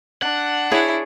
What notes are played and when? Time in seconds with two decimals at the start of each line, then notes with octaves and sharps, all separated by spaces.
0.22 D4 F#5
0.71 E4 G#4 C#5